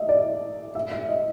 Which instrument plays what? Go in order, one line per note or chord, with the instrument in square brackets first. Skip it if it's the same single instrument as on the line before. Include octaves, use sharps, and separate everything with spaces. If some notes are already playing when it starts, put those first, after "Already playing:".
Already playing: [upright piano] D#5 E5
D5
E5
E5
D#5